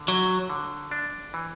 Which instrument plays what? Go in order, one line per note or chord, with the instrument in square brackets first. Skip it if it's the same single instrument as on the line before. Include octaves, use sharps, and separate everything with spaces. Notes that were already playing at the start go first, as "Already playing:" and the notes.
Already playing: [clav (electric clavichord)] D3
[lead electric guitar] F#3 [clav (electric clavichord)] E4
[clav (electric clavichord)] D3
D4
E3